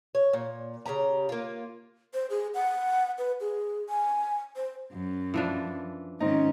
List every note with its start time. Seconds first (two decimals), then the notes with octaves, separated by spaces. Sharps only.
0.15 C#5
0.33 A#2
0.86 C#3 E3 G4 A#5
1.29 A#3 F4
2.14 C5
2.30 G#4
2.54 F#5
3.18 B4
3.40 G#4
3.89 G#5
4.56 C5
4.92 F#2
5.34 E3 F3 D4
6.20 G#2 D#3 C4 C#4 D#4